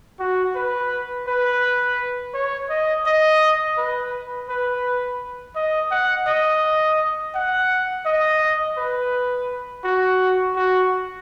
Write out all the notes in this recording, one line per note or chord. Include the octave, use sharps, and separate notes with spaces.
F#4
B4
B4
C#5
D#5
D#5
B4
B4
D#5
F#5
D#5
F#5
D#5
B4
F#4
F#4